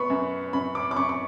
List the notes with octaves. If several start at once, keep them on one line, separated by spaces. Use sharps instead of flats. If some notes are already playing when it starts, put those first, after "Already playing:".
Already playing: B3 B5 C#6
F#2
F#2 B5
D6
D6
F#2 C#6
C#6